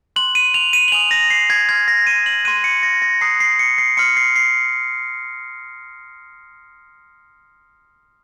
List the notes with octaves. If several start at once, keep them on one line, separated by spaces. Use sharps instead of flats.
C6 F#6 F#7
D#7
F7
D#7
F#7
G#5 D#6 F#6 F7
A#6
C7
G#6
C6 F6 G#6
A#6
D#7
F#7
C6 F#6 D#7
C#7
A#6
A#6
A#5 D#6 F#6 C7
C7
C#7
C7
C6 F6 C#7
C7
C7